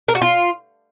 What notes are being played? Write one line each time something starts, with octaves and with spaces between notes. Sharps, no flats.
A#4
F#4
F4